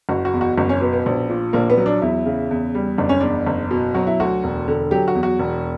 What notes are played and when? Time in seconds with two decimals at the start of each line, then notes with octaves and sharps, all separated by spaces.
0.09 F#1 F#4
0.25 F#4
0.34 E2
0.41 F#4
0.57 F#1 F#4
0.69 C#4
0.81 B2 B3
0.93 B3
1.06 A#1
1.29 A#2
1.53 A#1 A#3
1.70 B3
1.78 F#3
1.86 D4
2.02 E2 E4
2.26 C#3
2.51 E2
2.75 G3
2.98 F#1 D4
3.09 C#4
3.20 E2 D4
3.47 F#1
3.71 B2
3.94 F#3 F#4
4.07 E4
4.20 D2 F#4
4.44 E1
4.68 D3
4.91 F#3 G4
5.08 F#4
5.15 E2
5.23 F#4
5.39 E1